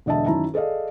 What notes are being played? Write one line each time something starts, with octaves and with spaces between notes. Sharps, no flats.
E1 D3 D#5 E5 A5
F#2 D#3 E4 A5 A#5
G#4 A4 D5 D#5 F5